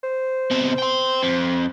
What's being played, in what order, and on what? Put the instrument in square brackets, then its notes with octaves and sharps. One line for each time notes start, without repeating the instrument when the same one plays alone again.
[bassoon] C5
[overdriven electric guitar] B2 C4
G5 C6
F2